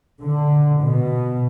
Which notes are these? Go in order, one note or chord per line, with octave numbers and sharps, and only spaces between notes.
D3
B2